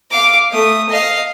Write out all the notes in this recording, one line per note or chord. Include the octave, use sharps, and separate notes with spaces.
F5 D6
A3 D#6
D#5 F5